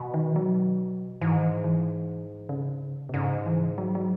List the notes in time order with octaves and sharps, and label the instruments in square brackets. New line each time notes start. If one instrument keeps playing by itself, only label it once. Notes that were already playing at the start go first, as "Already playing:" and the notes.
Already playing: [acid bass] B2
[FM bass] D#3
E3
F#3
[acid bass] G#2 [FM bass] E3
[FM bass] D#3
E3
E3
C#3
B2
[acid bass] G#2 [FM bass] C#3
[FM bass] E3
F#3
F#3